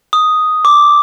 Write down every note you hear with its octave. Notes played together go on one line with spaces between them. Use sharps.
D#6
D6